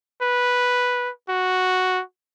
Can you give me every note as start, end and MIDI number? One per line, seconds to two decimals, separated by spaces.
0.22 1.10 71
1.29 2.02 66